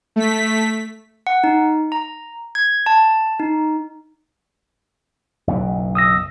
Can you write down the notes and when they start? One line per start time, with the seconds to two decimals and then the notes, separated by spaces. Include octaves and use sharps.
0.16 A3 B6
1.27 F#5
1.44 D#4
1.92 A#5
2.55 G#6
2.86 A5
3.40 D#4
5.47 F#1 B1 B2
5.95 D#6 E6 A#6